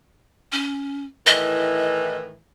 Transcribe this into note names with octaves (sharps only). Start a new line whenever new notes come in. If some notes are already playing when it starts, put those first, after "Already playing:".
C#4
A2 D#3 E3 D#5